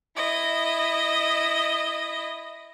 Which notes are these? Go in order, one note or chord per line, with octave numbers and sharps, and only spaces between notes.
E4 D#5